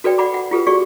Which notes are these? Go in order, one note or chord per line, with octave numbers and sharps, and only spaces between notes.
F#4 A4 B4 D5 G5
D5 F#5 B5 D6
F#5
F4 G4 A4 B4
F#4 G#4 D5 C#6